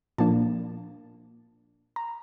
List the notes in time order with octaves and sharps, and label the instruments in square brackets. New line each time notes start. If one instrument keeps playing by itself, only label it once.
[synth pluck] A#2 F3 A#3 D4 A5
A#5